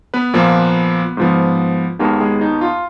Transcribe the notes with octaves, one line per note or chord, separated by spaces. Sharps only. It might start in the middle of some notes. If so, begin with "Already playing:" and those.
B3 B4
A#2 F3 A#3
G#2 F3 B3
D#2 D#3 G#3 A#3 B3 A#4
G#3 G#4
D#4
F4